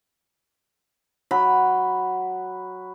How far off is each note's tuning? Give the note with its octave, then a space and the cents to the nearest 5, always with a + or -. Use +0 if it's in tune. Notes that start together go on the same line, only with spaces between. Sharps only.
F#3 +0 B5 +0